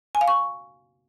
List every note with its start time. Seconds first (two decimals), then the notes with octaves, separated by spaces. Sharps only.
0.15 G#5
0.21 F5
0.28 C#6